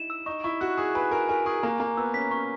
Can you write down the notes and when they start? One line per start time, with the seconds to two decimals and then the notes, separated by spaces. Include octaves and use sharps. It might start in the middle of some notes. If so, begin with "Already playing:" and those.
Already playing: D#4 E4 E7
0.10 E6
0.26 D#4 C#6
0.44 E4 C#6
0.61 F#4 F#6
0.78 G#4 C#6
0.95 B4 G#5
1.11 A#4 G#5
1.29 A#4 G#5
1.46 G#4 C#6
1.63 A#3 A#5
1.80 A#3 A#5
1.97 B3 E6
2.14 C#4 B6
2.31 C#4 C#6